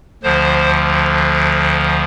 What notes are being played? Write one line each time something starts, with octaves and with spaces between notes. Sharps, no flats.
D2 D3 F3 C5